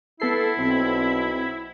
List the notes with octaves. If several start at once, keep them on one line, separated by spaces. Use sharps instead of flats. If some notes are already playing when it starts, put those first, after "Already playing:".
B3 E4 A4 C7
B1 C4